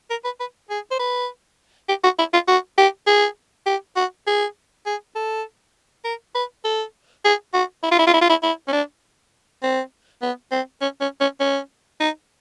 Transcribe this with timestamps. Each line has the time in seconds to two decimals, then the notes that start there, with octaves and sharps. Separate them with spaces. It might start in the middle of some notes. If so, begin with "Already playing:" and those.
0.10 A#4
0.24 B4
0.40 B4
0.70 G#4
0.91 C5
1.00 B4
1.89 G4
2.04 F#4
2.19 E4
2.33 F4
2.48 F#4
2.78 G4
3.07 G#4
3.67 G4
3.96 F#4
4.27 G#4
4.86 G#4
5.15 A4
6.05 A#4
6.35 B4
6.65 A4
7.25 G#4
7.54 F#4
7.84 E4
7.91 F4
7.99 E4
8.07 F4
8.14 E4
8.21 F4
8.30 E4
8.43 E4
8.68 C#4
8.73 D4
9.63 C4
10.22 B3
10.51 C4
10.81 C#4
11.01 C#4
11.21 C#4
11.40 C#4
12.00 D#4